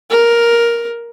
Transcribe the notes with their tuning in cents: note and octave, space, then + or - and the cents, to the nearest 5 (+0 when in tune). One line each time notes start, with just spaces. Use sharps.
A#4 +10